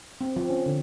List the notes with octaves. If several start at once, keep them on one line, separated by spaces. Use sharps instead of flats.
C4
F3
C#4
D3